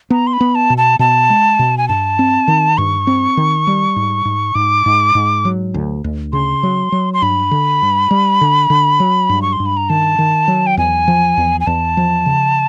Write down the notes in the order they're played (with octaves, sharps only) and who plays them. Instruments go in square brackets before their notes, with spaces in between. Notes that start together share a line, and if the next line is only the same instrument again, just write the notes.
[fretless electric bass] B3 [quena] A#5
[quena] C6
B5
[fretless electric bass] B3
[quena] A5
[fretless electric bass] B2
[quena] A5
[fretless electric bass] B2 [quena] A5
[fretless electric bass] G#3
B2
[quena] G#5
[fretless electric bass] G2 [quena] A5
[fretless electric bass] C4
D#3
[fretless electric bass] G2 [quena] C#6
[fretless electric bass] C4
D#3
G3
G#2
G#2
[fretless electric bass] G#2 [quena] D6
[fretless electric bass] G#2
G#2
F#3
D2
D2
[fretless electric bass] C#3 [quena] C6
[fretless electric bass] F#3
F#3
[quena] C6
[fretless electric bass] G2 [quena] B5
[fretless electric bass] D3
G2
G3
D3
D3
F#3
G2
[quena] C#6
C6
[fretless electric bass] G2
[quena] B5
A#5
[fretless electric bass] D#3 [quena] A5
[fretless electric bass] D#3
F#3
[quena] G5
[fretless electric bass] E2 [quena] G#5
[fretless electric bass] F3
E2
[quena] G#5
[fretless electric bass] E2 [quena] A5
[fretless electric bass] F3
C#3